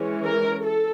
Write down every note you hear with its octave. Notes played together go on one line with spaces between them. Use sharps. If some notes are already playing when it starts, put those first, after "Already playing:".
Already playing: E3 G#3 C#4
A#4
A4